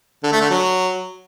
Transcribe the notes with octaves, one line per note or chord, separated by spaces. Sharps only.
D3
A3
D3
F#3